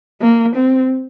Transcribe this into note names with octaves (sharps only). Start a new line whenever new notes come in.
A#3
C4